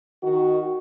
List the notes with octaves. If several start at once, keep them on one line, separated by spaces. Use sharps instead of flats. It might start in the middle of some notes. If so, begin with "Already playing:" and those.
D#3 F#4